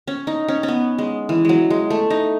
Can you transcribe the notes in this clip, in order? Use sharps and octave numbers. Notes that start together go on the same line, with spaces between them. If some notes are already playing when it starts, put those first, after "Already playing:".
C#4
D#4
C#4
C#4
B3
G#3
E3
F#3 G#3
G#3
A3
D#4